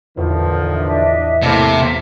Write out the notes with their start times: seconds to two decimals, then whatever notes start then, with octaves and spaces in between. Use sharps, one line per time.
0.17 A1 E2 D3 D#3 F3
0.75 D4 D#5 E5
1.42 A2 C3 A#3 A4 E5